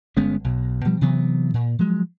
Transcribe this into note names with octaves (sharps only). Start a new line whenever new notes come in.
G1 G#3 B3 C#4
B1 B2
B2 F3 G3
C3 E3 F#3 B3
A#2
F3 F#3 G#3